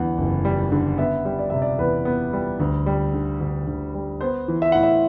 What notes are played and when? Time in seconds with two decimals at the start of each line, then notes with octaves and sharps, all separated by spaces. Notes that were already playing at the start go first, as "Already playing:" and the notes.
Already playing: E2 D3 G3 F#5
0.18 F#1
0.45 G3
0.72 D3
0.98 B3 E5
1.25 G3
1.39 D5
1.50 C3 E5
1.62 D5
1.78 E2 B4
2.05 B3
2.33 G3
2.60 D2
2.86 G3
3.14 D3
3.41 D2
3.67 D2
3.94 G3
4.21 B3 C5
4.48 E3
4.62 E5
4.72 A2 F#5
4.83 E5